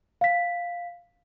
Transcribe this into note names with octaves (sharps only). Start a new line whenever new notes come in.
F5 B6